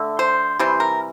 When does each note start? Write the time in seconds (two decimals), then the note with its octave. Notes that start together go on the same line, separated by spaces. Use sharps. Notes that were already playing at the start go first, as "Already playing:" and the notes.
Already playing: D3 A3
0.19 C5
0.59 C3 E3 G3 C5
0.80 A#4